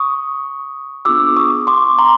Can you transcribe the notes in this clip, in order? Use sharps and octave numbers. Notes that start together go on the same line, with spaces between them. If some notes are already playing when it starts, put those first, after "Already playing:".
Already playing: C#6 D#6
B3 D4 F4 G#4 D6 E6
C#6 D#6
C6 D6
A#5 C6